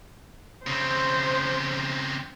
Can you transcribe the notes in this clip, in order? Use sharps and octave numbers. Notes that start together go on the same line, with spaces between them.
C#3 C4 C5